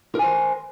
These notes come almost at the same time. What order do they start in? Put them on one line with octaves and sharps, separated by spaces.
A#4 G#5 C5